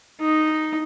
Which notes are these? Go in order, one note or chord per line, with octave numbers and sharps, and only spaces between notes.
D#4